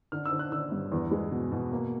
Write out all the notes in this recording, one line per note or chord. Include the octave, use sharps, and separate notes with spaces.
D3 F6
E6
D3
F#6
D3 E6
G2
E2
G#3
B2
B2
A#3